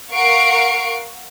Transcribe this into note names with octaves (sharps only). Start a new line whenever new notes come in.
A#4 F5 F#5 C#6 C7 D7